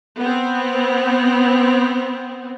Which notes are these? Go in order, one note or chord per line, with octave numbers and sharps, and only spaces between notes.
B3 C4